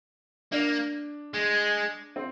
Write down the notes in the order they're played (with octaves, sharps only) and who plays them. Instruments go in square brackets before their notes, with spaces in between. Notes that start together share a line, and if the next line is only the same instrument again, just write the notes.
[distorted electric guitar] A#3 [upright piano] D4
[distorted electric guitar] G#3
[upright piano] C4